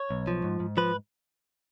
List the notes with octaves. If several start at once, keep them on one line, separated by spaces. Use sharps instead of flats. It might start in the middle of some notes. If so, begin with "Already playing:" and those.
Already playing: C#5
B1
F3
G#2
G#2
F3 B4